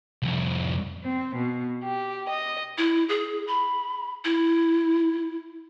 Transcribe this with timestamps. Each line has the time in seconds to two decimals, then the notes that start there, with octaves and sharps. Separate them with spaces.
0.22 C2 F2
1.03 C4
1.35 B2
1.82 G4
2.28 D#5
2.78 E4
3.09 G#4
3.47 B5
4.25 E4